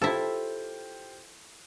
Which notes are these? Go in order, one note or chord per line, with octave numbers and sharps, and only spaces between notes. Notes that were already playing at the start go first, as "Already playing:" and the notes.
E4 F4 G4 A4 C5